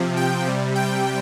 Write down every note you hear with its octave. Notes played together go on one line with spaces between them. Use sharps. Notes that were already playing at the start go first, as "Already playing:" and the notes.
Already playing: C3 F3
G5
C3 G3
G5